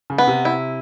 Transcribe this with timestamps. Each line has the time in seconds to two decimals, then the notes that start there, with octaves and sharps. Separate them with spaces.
0.10 C#3
0.18 B3
0.27 C3
0.45 E4